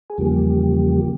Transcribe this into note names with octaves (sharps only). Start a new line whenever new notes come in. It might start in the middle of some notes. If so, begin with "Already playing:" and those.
G#4
E2 C#3 F3 G3 A#3 G4